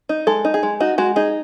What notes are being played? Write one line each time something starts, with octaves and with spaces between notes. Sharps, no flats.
D#4
G#3 A4
D#4
G#4
G#3
D#4 F#4
G#3 F#4
D#4 G#4